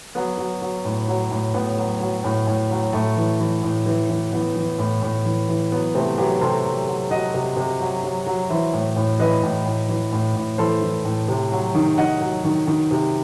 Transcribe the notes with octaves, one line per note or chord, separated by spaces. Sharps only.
F#3 B3
F#3
F#3
A2
F#3
A2
A2 B3
F#3
F#3
A2
A2
F#3
A2 A3
E3
E3
A2
E3
E3
E3 B3
E3
A2
A2
E3
E3
F#3 B3
C3 A3 C4
F#3 G4 B4
C3 A4 C5
F#3
F#3
F#3 D#5 F#5
C3
C3
F#3
F#3
F#3
E3 C5 E5
A2
A2
E3 B4 D#5
A2
A2
E3
A2
A2
E3 A4 C5
E3
A2
C3
F#3
D#3
D#3 D#5 F#5
F#3
D#3
D#3
C3